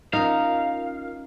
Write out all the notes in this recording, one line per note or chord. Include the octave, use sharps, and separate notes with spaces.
C#4 D#4 F4 A#4 F5